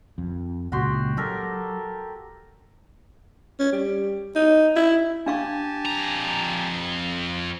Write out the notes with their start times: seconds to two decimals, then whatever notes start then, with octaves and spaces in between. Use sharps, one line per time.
0.18 F2
0.72 C#2 A#2 C#3 F#4 G4 C6
1.17 F#3 G4 A4 A#4
3.59 C#4
3.73 G3
4.35 D#4
4.76 E4
5.26 D4 G4 F5 G#5 A5 C#6
5.86 F2 A#5